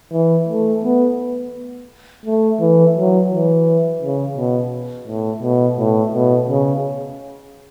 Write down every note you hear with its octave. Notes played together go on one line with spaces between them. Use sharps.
E3
A3
B3
A3
E3
F#3
E3
C#3
B2
A2
B2
A2
B2
C#3